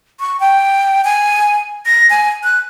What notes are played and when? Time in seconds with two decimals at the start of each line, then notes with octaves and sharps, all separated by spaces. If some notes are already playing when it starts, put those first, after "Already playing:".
0.20 C#6
0.40 G5
1.05 G#5
1.86 A#6
2.10 G#5
2.44 F#6